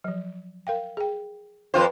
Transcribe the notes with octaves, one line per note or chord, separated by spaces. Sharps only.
F3 F#3
A#4 F5 G5
G#4 G5
F2 F4 B4 C5 G5